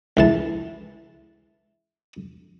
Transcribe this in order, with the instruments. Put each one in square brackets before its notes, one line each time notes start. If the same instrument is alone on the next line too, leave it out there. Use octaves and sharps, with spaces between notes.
[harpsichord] C#2 E3 A5